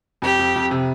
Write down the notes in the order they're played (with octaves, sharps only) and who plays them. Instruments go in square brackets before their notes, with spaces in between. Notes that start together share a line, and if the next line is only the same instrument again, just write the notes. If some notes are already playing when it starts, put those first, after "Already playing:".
[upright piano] F2 [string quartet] G4
[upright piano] F2
F2
C3